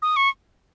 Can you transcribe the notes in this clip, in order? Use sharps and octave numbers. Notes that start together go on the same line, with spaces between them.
D#6
C#6